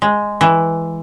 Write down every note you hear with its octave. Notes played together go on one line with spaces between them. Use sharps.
G#3
E3